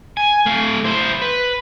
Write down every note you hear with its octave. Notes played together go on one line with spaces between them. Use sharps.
G#5
A3 F5
E4 C5
B4